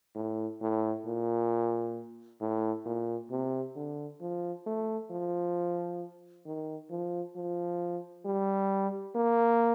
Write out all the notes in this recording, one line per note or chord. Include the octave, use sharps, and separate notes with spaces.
A2
A2
A#2
A2
A#2
C3
D3
F3
A3
F3
D#3
F3
F3
G3
A#3